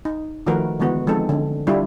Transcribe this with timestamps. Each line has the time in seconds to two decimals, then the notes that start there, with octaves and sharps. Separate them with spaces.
0.05 D#4
0.47 D#3 F3 A3 F#4 A#4 B4
0.80 D3 E3 G#3 B3 F#4
1.07 F3 G#3 C4 D#4 A4
1.29 D3
1.67 G3 D4 E4 F4 G4